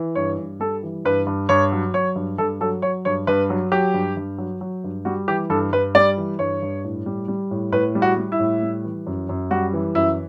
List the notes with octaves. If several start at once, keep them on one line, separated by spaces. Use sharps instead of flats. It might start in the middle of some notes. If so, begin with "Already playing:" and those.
Already playing: E3
G2 C#5
G2
G3 A4
E3
G2 B4
G2
G2 C#5
F#3
F#3 C#5
G2
G2 A4
F#3 A4
F#3 C#5
G2 C#5
G2 B4
F#3
F#3 G4
G2
G2
F#3
F#3
G2
G3 F#4
E3 G4
G2 A4
G2 B4
G3 D5
E3
G2 C#5
G2
A2
G3
G3
A2
A2 B4
G3
F#4
G3
E4
A2
G3
E3
F#2
F#2
G3 F#4
E3
F#2 E4